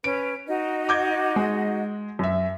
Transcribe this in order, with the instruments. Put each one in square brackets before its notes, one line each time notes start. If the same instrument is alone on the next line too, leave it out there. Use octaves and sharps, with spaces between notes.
[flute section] C#4 B4 [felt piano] D7
[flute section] D#4 F#4 D#5
[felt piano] D6 G6 G#6
G#3
F#2 E5